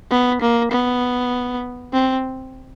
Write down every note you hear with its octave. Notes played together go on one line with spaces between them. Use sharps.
B3
A#3
B3
C4